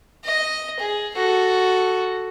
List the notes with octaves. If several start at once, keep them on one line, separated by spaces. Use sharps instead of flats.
D#5
G#4
F#4 A4